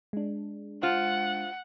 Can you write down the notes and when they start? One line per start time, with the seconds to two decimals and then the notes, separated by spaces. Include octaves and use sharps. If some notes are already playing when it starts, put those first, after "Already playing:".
0.13 G#3 D4
0.83 F4 C5 F#5